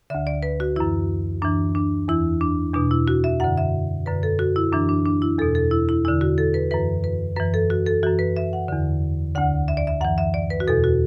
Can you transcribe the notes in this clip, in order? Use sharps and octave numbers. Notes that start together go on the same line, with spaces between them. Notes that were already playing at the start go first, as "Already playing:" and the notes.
D2 D3 E5
D5
B4
F#4
F#2 E3 E4
F#2 E3 D4
D4
E2 E3 E4
D4
E2 B2 D4
E4
F#4
E5
F#2 D3 F#5
E5
F#2 D3 B4
A4
F#4
E4
F#2 E3 D4
D4
D4
E4
E2 B2 A4
A4
E4
E4
E2 D3 E4
F#4
A4
B4
F#2 E3 B4
B4
F#2 E3 B4
A4
F#4
A4
F#2 E3 F#4
B4
E5
F#5
E2 D3
D2 D3 F#5
E5
D5
E5
F#2 E3 F#5
E5
D5
B4
F#4
E2 B2 A4
F#4